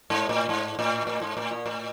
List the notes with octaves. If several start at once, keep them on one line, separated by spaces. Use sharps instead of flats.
G#2
A2
G#2
A2
A2
G#2
A2
A#2
A2